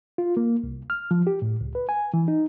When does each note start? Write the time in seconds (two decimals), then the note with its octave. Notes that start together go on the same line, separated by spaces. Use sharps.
0.18 F4
0.37 A#3
0.64 C2
0.90 F6
1.11 F3
1.27 G4
1.42 A2
1.61 C#2
1.75 B4
1.89 G#5
2.14 E3
2.28 D#4